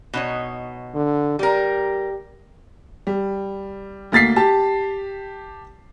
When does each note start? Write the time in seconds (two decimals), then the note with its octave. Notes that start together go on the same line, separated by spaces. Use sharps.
0.14 B2 D#4 C#5
0.95 D3
1.39 G3 G4 A#4
3.07 G3
4.12 D2 A#3 A6 B6 C7
4.36 G4 A5